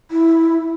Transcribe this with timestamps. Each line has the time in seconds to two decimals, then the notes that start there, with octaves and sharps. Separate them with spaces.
0.11 E4